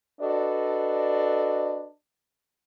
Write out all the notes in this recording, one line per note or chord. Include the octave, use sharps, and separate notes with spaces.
D4 F#4 A4 B4 D5 D#5